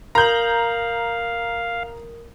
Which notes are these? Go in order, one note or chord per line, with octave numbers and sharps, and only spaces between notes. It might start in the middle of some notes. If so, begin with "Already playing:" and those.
A#4 F5 A#5 D#6 G6 F#7